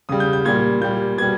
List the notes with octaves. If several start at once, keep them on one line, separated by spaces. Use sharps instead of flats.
C#3 G3 D#6
G6
G6
A#2 G3 G#6
A#2 G3 G6
B2 G3 G#6